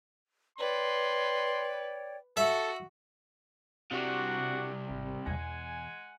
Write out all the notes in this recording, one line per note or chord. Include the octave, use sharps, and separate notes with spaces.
B4 C#5 D5 G5 C6
F#4 A4 E5
C3 F#3 G3 D4 F#4
G#1
E2 B2 G#3 F#5 G#5